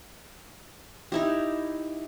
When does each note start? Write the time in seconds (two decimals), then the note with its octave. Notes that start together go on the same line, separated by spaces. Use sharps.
1.12 D#4 E4 G4